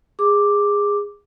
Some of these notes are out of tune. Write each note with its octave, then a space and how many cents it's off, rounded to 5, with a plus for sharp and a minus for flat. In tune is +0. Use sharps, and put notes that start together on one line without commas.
G#4 -20 D6 +0